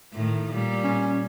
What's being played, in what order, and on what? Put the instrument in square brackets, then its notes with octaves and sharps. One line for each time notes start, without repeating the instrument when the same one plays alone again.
[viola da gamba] A2 D#3
A#2 G3
[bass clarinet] C#4